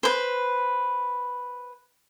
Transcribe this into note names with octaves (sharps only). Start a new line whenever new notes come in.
B4 C5